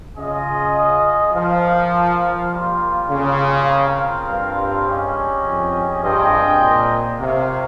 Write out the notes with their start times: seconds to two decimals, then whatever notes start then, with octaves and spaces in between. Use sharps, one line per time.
0.16 C#3 F4 G#4 D#5
1.33 F3 F4 A#4 F5
2.50 G3 A#3 F4
3.09 C#3
3.68 C4 F4 A#4 F5
4.26 G2
4.85 G3 C#4 G#4 D#5 G5
5.44 F2
6.02 G2 C4 F4 G#4 D#5 G5
6.61 A#2
7.19 C3 F4 A#4 C#5 F5